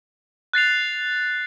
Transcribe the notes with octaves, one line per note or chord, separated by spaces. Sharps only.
F#6 A6 C7 F7